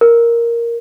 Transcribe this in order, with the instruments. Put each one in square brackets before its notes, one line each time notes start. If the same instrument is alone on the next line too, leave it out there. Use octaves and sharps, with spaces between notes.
[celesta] A#4